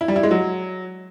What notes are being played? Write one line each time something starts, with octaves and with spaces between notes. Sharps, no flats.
E4
G3
E4
G#3
F#3